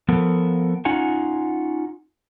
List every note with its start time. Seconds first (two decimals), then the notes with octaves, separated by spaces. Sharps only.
0.08 F3 B3 A4 A#4
0.85 C#4 D#4 F4 F#5 G#5